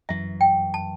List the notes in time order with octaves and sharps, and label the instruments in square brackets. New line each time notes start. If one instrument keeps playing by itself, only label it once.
[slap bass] G1 F#2 E3 [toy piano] E5
[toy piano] G5
A5